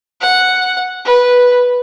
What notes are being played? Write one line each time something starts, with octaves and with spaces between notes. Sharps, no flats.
F#5
B4